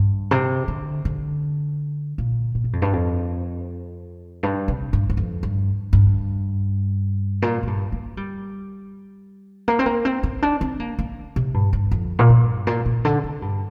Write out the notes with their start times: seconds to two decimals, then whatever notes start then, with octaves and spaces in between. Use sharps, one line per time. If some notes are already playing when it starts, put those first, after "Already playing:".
Already playing: G2
0.31 C3
0.68 D3
1.05 D3
2.18 A#2
2.55 A#2
2.64 G2
2.73 F2
2.82 G2
2.93 F2
4.43 G2
4.68 C3
4.93 G2
5.10 G2
5.17 F2
5.43 G2
5.93 G2
7.42 A#2
7.63 A#2
7.67 G2
7.92 A#3
8.17 G3
9.68 A#3
9.79 C4
9.86 A#3
10.05 C4
10.23 C4
10.42 D4
10.61 C4
10.80 A#3
10.99 A#3
11.36 C3
11.54 G2
11.73 G2
11.91 F2
12.19 A#2
12.29 G2
12.67 A#2
12.86 A#2
13.05 D3
13.24 C3
13.42 G2